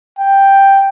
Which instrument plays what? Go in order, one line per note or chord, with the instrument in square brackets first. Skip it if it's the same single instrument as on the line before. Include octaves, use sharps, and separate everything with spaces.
[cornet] G5